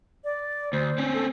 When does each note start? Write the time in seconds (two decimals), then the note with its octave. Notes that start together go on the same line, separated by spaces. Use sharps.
0.24 D5
0.73 D2 C5
0.98 C4 C#4
1.14 A4